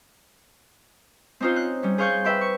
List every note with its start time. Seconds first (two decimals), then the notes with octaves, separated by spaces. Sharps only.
1.40 C4 C#4 D#4 F4 C5
1.56 F#6
1.83 G3 C#4
1.98 G#4 C5 F5 C#6 F#6 G6
2.24 B4 E5 G5 C6
2.41 C#6